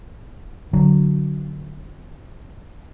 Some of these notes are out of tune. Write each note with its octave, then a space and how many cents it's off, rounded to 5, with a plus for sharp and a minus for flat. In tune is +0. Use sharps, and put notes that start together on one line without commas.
D3 +0 F#3 +0